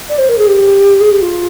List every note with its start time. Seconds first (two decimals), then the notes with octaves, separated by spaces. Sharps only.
0.09 D5
0.18 C5
0.28 A#4
0.38 G#4
0.46 G4
1.00 G#4
1.10 G4
1.21 F4